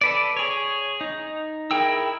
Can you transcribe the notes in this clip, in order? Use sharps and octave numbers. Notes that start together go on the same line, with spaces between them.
A4 B4 D5
G#4 C#5
D#4
E4 G#4 A#4 G5 E6